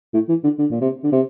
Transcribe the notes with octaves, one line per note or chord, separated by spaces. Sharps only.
A2
E3
D3
D3
A#2
C3
D3
C3